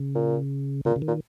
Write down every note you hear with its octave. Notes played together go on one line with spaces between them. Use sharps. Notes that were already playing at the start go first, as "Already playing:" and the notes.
Already playing: C#3
A#2
A#2 C#3
C#3
D#3
A#2